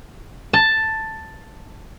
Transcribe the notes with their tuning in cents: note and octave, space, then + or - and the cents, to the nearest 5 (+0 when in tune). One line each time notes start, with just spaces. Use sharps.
A5 +5